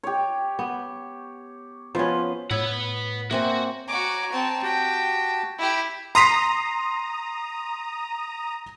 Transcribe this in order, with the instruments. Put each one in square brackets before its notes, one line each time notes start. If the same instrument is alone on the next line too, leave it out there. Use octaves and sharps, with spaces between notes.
[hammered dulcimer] G4 C#5
[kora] B3
[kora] F3 C#4 [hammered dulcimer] B3 F4 B4
[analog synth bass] A2 [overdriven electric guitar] B4 F#5 [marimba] C#5 E6 G#6
[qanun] A#3 C4 G#5 [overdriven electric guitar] F#4 [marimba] E5
[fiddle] F#4 D6 [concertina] C#5 G#5 A#5
[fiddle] C4 A5
[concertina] F#4 G4 A5 [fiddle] G5
[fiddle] E4 G4
[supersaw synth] A#5 D#6 [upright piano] C6 B6 C7